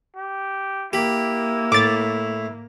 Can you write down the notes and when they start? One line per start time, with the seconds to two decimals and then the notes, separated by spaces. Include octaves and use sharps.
0.16 G4
0.93 A#3 E4 G4 B5
1.72 A2 D6 A6